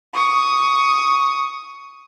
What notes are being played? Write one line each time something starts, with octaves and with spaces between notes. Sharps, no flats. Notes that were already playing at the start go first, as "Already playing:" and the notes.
C#6 D#6